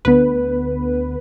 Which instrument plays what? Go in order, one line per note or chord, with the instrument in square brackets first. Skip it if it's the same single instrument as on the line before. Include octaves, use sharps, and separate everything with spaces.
[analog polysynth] D2 D3 B3 B4